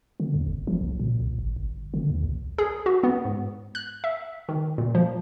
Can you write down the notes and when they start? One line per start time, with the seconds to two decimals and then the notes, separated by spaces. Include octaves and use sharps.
0.20 D3
0.34 E2
0.47 F#1
0.67 F3
0.81 B1
1.00 A#2
1.20 B1
1.39 G#1
1.56 G1
1.94 D3
2.10 D#2
2.23 B1
2.59 G#4
2.86 F#4
3.03 B3
3.25 G#2
3.75 F#6
4.04 E5
4.49 D#3
4.78 A#2
4.95 F3